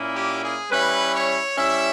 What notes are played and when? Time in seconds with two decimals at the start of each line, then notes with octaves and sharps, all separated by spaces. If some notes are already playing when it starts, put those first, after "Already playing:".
Already playing: A#2 A#3 C#4 E4
0.13 G4
0.43 G#4
0.71 G3 C#4 E4 B4
1.14 C#5
1.57 G3 C#4 E4 E5